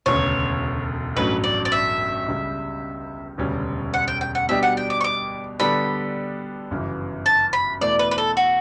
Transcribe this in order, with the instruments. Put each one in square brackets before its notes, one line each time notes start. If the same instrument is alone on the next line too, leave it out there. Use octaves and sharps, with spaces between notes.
[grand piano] E1 D2 C#3 [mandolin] C#5
[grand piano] A1 G2 F#3 A3 C#4 [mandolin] B4
[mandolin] D5
D5
E5
[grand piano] C#2 C#3 G3
E1 D2 C#3 G3 C#4
[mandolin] F#5
G5
G5
F#5
[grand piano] B2 G3 D4 G4 [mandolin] E5
[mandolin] F#5
G5
D6
C#6
D6
[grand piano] D3 G3 B3 D4 A4 [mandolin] B5
[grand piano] G1 F#2 C#3 E3
[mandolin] A5
B5
[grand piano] E2 B2 A3 E4 [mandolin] D5
[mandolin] B4
B4
A4
F#4